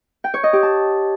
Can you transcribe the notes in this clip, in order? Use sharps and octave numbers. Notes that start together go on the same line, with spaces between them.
G5
C#5
D#5
G4
A5